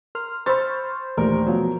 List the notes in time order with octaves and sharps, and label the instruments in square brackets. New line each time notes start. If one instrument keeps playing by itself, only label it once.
[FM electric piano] A#4 C6 F6
[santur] C5 [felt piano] B5 E6 A6 [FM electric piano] C#6 F6
[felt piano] A#1 D#2 [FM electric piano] E3 A3 G4 [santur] A#4
[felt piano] B2 F3 F#3